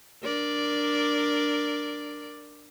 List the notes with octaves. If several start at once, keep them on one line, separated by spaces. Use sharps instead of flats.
D4 A#4 D5